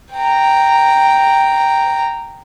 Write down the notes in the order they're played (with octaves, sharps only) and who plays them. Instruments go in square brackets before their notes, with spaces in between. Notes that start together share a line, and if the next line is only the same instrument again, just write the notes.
[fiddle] G5 A#5